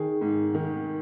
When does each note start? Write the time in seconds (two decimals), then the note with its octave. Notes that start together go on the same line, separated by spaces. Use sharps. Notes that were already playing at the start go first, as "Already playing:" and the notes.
Already playing: D#3 G#4
0.21 G#2
0.54 D#3